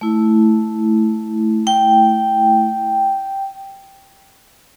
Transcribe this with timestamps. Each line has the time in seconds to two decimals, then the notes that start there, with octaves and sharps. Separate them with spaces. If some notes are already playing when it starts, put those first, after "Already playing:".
0.01 A3 E4
1.67 G5